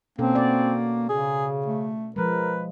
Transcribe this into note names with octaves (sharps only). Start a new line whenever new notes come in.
B2 A#3 C4 C#4 A4
F#4 D5
C#3 G#4
A3
F3 G#3 A#4 B4